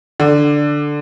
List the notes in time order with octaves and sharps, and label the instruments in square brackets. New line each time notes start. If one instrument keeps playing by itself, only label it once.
[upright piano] D3